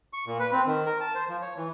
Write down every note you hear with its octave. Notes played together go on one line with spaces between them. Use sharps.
C#6
A#2
B4
C4
D#3
A#4
A5
C5
F3
C#5
E3